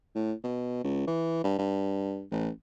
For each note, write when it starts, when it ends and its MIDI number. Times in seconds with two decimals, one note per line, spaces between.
0.15 0.33 45
0.44 0.81 47
0.84 1.06 37
1.07 1.44 52
1.44 1.54 43
1.58 2.24 43
2.31 2.49 33